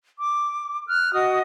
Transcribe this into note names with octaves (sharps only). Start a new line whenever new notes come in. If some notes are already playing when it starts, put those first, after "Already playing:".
D6
F6 F#6
F#4 D#5 D#6